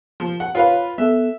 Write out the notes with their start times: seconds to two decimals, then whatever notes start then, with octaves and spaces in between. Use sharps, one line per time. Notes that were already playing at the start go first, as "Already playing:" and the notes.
0.20 F3
0.40 F#5
0.55 F4 B4 C#5 F5
0.98 B3 A4 E5